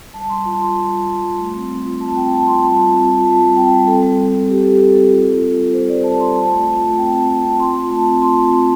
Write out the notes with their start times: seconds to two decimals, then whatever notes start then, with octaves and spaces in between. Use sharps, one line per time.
0.14 G3 A5
0.29 G3 C6
0.45 F4 A5
0.61 F4 C6
0.76 G3
0.92 F4
1.07 G3
1.24 G3
1.39 A3
1.54 C4
1.70 C4
1.85 F4
2.01 C4 A5
2.16 C4 G5
2.31 C4 A5
2.47 F4 C6
2.63 G3 A5
2.78 F4
2.93 C4
3.10 F4
3.25 G3 A5
3.40 G3
3.56 C4 G5
3.72 G3
3.87 C4 A4
4.03 G3
4.18 G3
4.34 C4
4.49 C4 G4
4.65 C4 A4
4.80 C4 A4
4.95 C4 A4
5.11 F4
5.27 F4
5.42 F4
5.57 G3
5.73 G3 C5
5.89 G3 D5
6.04 G3 A5
6.20 F4 C6
6.35 F4 A5
6.50 A3
6.66 F4
6.83 A3
6.97 C4 G5
7.12 C4 A5
7.29 C4 G5
7.43 C4 A5
7.59 F4 C6
7.75 F4
7.90 A3 A5
8.06 C4
8.22 F4 C6
8.37 C4
8.52 C4 C6